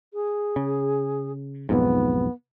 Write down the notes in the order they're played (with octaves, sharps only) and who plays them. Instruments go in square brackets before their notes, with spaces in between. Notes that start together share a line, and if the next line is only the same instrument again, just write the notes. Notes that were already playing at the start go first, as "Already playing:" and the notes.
[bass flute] G#4
[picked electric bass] C#3
[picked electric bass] B1 F2 G#2 [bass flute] B3